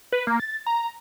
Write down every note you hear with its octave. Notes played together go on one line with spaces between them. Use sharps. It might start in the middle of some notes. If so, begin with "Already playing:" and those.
B4
A#3
A6
A#5